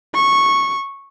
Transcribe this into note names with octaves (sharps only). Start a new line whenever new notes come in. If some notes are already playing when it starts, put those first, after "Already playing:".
C#6